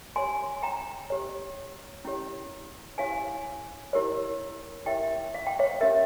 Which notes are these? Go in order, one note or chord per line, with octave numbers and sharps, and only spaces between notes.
G4 C#5 G#5 C6
G5 A#5
G4 C#5
C#4 E4 G4 C#5
C#4 E4 G4 C#5 F5 G#5
E4 G4 A#4 C#5
E4 G4 A#4 C#5 E5 G5
F5
G5
C#5 F5
C#4 G4 A#4 E5